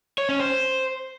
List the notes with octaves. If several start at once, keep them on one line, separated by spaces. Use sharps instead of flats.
C#5
C#4
C5